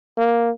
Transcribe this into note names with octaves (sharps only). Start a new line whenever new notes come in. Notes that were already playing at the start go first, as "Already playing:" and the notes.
A#3